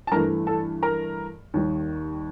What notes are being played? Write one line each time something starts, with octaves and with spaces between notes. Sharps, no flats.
A5
G2 E3 A3 A#4 A#5
A4 A5
A#4 A#5
D#2 D#3 G3